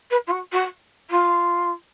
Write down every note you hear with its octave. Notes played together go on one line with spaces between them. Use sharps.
B4
F4
F#4
F#4
F4